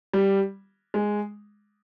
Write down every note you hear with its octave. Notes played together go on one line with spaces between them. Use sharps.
G3
G#3